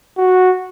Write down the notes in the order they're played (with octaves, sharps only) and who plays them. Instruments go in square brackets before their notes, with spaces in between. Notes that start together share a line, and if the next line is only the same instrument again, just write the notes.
[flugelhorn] F#4